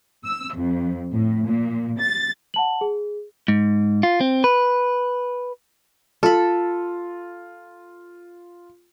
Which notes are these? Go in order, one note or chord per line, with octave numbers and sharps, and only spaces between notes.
E6
F2
A2
A#2
A6
F#5 A5 F#7
G#4
G#2
F4
C4
B4
F4 A4 B5